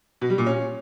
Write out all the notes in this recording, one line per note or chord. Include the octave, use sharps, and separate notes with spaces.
B2
G3
A#2
C#4